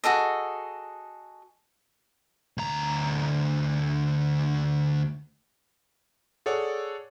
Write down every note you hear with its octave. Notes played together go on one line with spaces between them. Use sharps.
F#4 G#4 A4 D#5
D2 A#5
G#4 A4 C#5 D5 F#5